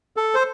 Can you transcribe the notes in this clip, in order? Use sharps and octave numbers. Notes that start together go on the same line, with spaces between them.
A4
C5